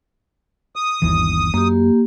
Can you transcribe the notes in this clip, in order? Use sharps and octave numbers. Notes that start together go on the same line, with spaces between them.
D#6
G1 D#2 E3
F#2 A#3 G4